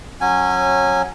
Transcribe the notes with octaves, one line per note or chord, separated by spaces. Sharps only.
F#3 C#4 G#5